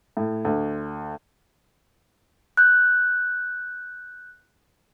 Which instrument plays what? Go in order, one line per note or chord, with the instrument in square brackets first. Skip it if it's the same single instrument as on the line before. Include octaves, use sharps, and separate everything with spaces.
[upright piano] A2
D2
[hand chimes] F#6 G6